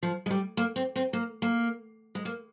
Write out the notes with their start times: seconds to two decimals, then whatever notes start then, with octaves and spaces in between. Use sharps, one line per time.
0.03 F3
0.26 G#3
0.30 G3
0.57 A#3
0.76 C4
0.96 C4
1.13 A#3
1.42 A#3
2.15 G#3
2.25 A#3